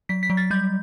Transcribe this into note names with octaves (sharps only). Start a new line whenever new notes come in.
F#3 B6
B6
F#3
A6
G3 G6